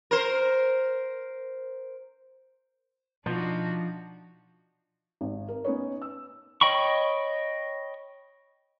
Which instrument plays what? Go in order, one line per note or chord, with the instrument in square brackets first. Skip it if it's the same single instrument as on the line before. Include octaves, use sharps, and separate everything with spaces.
[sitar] A#4 C5
[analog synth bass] B2 [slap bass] F3 [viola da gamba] D4 D#4 F#4
[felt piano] G#1
A#4
B3 C#4 D#4 B4 C#5
E6
[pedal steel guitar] C#5 D#5 G5 B5 C#6